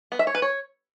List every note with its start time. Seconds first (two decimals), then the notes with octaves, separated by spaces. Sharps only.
0.12 B3
0.19 E5
0.27 C#5
0.35 B4
0.42 C#5